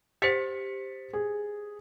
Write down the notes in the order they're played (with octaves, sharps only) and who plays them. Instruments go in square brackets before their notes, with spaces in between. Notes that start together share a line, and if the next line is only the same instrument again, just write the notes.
[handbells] G4 C5 [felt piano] A6 B6 C#7
[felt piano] G#4